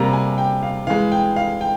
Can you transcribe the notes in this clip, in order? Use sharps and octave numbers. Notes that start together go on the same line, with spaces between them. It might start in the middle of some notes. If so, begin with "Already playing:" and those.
Already playing: C3 G3 A#3 A#5
G#5
G5
F5
E3 G#3 F5
G5
F5
G5